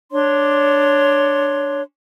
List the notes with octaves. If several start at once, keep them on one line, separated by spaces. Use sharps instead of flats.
D4 C#5 C6